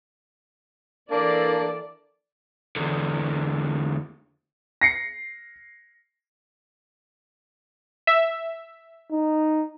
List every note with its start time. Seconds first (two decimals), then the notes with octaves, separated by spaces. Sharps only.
1.11 E3 A#3 D4 A4 D5
2.76 E2 D3
4.81 A#6 C7 C#7
8.07 E5
9.12 D#4